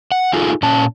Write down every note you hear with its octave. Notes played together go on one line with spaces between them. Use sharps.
F#5
D#4 F4 G#4 A4
A#2 C#4 A5